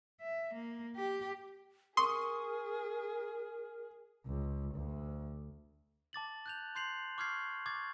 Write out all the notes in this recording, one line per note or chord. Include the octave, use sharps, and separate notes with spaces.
E5
A#3
G4
G#4 A#4 C6 C#6 D#6
C#2
D2
A5 D6 A6 F#7
F#6 G6 F7
C6 G6 C7 F7 F#7
C#6 D6 F6 G6 G#6 C7
C#6 D6 G#6 A6